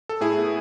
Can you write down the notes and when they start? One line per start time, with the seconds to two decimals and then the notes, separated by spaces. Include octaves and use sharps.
0.09 A4
0.21 A2 E4 G#4
0.38 B3